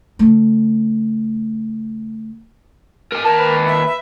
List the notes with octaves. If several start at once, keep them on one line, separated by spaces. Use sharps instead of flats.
C#3 A3
A#4 G#5
D#2 A#4 A5
B4
E5
E5